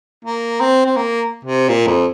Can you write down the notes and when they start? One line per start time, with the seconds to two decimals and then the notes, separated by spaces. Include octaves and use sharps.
0.25 A#3
0.61 C4
0.86 C4
0.97 A#3
1.45 C3
1.69 A#2
1.87 F2